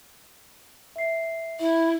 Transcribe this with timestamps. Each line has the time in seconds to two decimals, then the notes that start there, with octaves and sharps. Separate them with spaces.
0.96 E5 C7
1.59 E4 E5